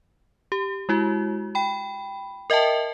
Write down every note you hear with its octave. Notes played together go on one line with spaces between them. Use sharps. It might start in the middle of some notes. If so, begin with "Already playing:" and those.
G4
G#3 E4 F#4
G5 B5
A#4 D#5 E5 G5 A5